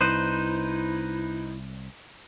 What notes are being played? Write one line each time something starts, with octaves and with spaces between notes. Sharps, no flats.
C2 D#4 E4 B4 C5